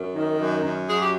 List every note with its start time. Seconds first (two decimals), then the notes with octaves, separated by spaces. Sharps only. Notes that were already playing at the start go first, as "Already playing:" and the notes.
Already playing: F#2
0.15 D#3
0.39 F#2
0.63 F#2
0.87 F#3 G#4
0.99 G4